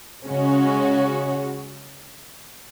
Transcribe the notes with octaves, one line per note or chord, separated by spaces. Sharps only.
C#3 G#3 C#4 F#4